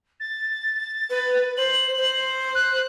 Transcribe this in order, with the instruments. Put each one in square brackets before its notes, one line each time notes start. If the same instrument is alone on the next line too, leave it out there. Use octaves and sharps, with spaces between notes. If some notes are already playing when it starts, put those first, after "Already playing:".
[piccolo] A6
[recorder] B4
[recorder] C5 [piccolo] F#7
[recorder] C5
[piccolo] F#6